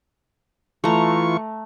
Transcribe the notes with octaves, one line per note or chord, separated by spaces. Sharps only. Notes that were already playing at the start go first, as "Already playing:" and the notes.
E3 A3 F4 A#5 C#6